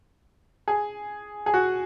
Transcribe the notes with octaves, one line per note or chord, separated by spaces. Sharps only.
G#4
G#4
F#4